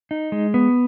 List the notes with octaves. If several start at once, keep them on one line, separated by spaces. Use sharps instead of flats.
D#4
G#3
B3